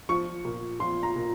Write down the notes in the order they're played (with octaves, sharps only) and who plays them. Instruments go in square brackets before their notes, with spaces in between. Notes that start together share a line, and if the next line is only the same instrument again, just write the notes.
[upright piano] F3 C#6
A#2
F3 C6
A#5
A#2